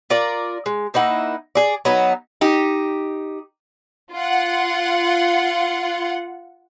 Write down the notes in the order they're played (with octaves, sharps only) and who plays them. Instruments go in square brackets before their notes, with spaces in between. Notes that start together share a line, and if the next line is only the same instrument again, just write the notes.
[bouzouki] F4 A#4 D5
G#3
A#3 D#4 E4 F#5
G#4 D5
F#3 B3 D#4
[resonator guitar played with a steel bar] D#4 G4
[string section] F4 F#5